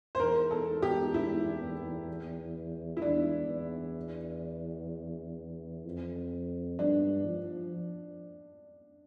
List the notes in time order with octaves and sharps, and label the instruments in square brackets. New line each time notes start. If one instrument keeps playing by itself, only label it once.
[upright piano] C5
[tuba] E2 [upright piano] A#4
[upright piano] A4
G4
E4
E4
[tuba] E2 [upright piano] D4
[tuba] E2
F2
[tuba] G2 [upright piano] D4
[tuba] F3